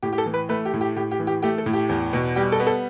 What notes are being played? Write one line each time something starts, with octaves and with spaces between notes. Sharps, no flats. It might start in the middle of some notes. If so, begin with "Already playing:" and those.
A2 G4
G4
A4
E3
B4
A3 B4
G4
A2
G4
A2 G4
G4
E3
G4
A3 G4
A4
A2
G4
E2
B2
G3 G4
A4
B3
A4